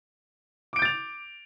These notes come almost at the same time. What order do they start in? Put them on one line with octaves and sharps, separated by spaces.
D6 D7 G6 A6 F7